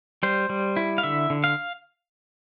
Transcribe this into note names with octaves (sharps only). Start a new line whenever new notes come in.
G3 C5
G3
E4
F5
D3 E5
D3
F5